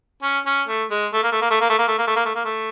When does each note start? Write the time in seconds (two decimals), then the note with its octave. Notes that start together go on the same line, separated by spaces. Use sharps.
0.23 C#4
0.46 C#4
0.68 A3
0.91 G#3
1.13 A3
1.23 A#3
1.32 A3
1.41 A#3
1.51 A3
1.61 A#3
1.70 A3
1.79 A#3
1.88 A3
1.98 A#3
2.07 A3
2.16 A#3
2.25 A3
2.35 A#3
2.45 A3